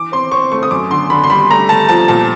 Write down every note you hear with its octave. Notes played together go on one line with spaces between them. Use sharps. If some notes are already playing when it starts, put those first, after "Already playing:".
Already playing: E3 D6
C4 C6
C4 C#6
A3 C#6
D#6
F#2 D6
D3 C6
D3 B5
C6
G3 B5
A3 A#5
A3 A5
F3 A5
A#2 A5